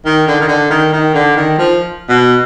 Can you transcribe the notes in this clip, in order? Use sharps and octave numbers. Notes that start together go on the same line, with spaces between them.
D#3
D3
D#3
D3
D#3
D#3
D3
D#3
F3
B2